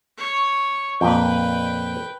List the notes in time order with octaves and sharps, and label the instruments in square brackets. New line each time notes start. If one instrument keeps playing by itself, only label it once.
[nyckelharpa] C#5
[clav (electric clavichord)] F2 A#2 [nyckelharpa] B4 G5